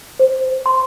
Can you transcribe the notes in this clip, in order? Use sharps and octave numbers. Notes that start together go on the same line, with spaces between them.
C5
C6